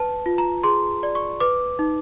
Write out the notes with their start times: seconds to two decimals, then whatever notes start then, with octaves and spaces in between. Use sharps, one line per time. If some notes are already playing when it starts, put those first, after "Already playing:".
Already playing: B4 A5
0.26 F4
0.38 A#5
0.64 G#4 C6
1.03 D5
1.15 C#6
1.40 B4 D6
1.79 D#4